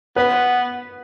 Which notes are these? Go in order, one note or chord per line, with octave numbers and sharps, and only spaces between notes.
B3 B4